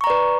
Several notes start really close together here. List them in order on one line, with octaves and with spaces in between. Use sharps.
C#6 A#5 D5 B4